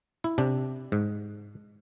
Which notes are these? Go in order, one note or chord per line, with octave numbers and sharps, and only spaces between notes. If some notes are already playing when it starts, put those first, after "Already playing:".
E4
C3 D4
G#2